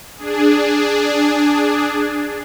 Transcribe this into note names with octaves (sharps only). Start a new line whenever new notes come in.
D4 G#4